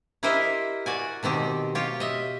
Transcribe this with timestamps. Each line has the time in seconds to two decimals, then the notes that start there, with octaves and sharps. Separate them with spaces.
0.23 E4 G4 A#4 C5 D#5 E5
0.86 F#4 D5 G#5
1.23 B2 D#3 C4 G4
1.75 F4 G4 C#5
2.00 D#5 E5